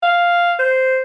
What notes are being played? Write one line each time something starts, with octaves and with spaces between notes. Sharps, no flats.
F5
C5